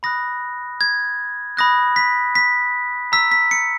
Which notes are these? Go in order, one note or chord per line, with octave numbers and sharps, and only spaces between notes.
B5 D#6 F#6 A#6
G#6
B5 D#6 F#6 A#6
B6
B6
A#5 E6 B6
B6
C#7